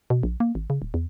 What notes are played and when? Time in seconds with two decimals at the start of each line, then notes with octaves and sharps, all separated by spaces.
0.10 B2
0.23 A#1
0.40 A#3
0.55 G#1
0.70 C#3
0.82 D1
0.94 E2